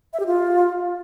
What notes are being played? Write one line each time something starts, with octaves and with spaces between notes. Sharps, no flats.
E5
G4
F4